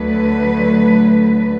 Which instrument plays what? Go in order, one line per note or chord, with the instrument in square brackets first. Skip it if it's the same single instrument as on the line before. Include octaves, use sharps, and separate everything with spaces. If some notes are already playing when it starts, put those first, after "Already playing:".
Already playing: [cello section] D2 D3 F#3 A3 B4